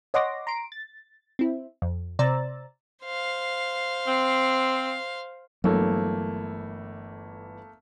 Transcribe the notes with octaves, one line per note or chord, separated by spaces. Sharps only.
C#5 D#5 F#5 C6 D6 A#6
A#5 C6 D7
A6
C4 E4
F2
C3 C5 D5 A#5 E6 A6
C5 F5
C4
G1 E3 F#3 A3 A#3